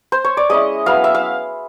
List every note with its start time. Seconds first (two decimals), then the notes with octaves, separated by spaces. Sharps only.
0.12 C5
0.25 C#5
0.37 D5
0.50 G#3 C#4 E4 D#5
0.86 F#3 B3 E4 F5
1.04 E5
1.15 F5